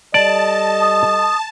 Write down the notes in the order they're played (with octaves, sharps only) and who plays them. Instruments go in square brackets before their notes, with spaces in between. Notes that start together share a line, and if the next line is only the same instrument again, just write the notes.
[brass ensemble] G3 A4 D#5 [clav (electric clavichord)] D5 [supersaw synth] A5
[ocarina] D#6